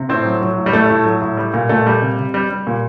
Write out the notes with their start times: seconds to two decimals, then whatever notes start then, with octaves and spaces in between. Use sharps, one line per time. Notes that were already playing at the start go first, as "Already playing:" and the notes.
Already playing: C3
0.09 A2 C4
0.25 F#3
0.41 F#3
0.57 A2
0.66 G3
0.73 A2 A3
0.90 A2
1.06 F#3
1.22 A2
1.37 G3
1.54 A#2
1.69 A#2 A3
1.86 G3
2.02 C3
2.18 C3
2.34 G3
2.50 G3
2.67 A#2